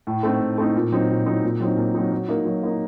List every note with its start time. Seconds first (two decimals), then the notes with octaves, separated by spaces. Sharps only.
0.07 A2
0.23 A3 C4 D#4
0.41 A2
0.58 A3 C4 D#4
0.75 A#2
0.92 F#3 C4 D#4
1.09 A#2
1.26 F#3 C4 D#4
1.43 A#2
1.60 F#3 C4 D#4
1.77 A#2
1.95 F#3 C4 D#4
2.11 F#3
2.28 A#3 D#4
2.45 F#3
2.63 A#3 D#4